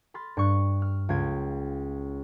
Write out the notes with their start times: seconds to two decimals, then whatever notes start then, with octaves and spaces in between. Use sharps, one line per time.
0.14 B5 C6 F6 A6
0.37 G2 C#6 F#6
0.82 F6
1.09 C#2 F4 G5 G#6